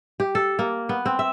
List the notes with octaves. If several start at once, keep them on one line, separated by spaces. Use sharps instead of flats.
G4
A4
A#3
B3
C4
E5